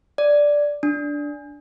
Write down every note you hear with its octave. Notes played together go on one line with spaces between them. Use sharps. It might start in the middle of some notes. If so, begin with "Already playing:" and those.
D5
D4